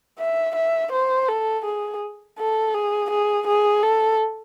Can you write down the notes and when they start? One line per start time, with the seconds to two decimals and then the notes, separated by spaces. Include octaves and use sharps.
0.19 E5
0.55 E5
0.92 C5
1.28 A4
1.65 G#4
2.38 A4
2.74 G#4
3.10 G#4
3.47 G#4
3.83 A4